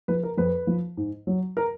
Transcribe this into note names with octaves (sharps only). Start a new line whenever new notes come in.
F3 B4
A#4
F2 B4
F3
G#2
F#3
A#4